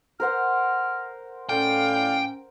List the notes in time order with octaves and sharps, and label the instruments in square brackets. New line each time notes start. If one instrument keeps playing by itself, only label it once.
[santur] A#4 C5 F#5 [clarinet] F6
[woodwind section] A2 D5 F5 [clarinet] C#4 [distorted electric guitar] G5